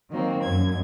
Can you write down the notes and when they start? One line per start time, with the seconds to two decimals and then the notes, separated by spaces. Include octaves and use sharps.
0.10 D#3 F#3 A#3 C4
0.43 F#2 G#6